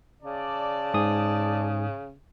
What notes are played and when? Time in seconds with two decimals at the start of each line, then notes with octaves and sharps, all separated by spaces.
0.22 C#3 D5 A5
0.94 G#2 G#4 D#6